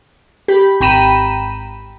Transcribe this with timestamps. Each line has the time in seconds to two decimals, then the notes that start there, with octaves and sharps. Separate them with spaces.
0.48 G4 B5
0.81 G#1 G5 A#5 B5 D#7 E7